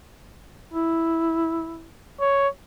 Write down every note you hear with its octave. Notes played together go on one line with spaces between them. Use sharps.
E4
C#5